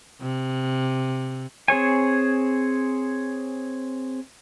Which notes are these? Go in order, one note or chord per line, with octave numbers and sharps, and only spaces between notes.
C3
C4 G#4 C#5 G#5